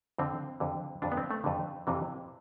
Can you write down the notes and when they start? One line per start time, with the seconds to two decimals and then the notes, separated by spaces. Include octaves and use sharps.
0.18 F2 D3 C4
0.60 F2 D3
1.02 F2 D3 D4
1.12 B3
1.17 C4
1.31 A3
1.44 F2 D3
1.87 F2 C3 E3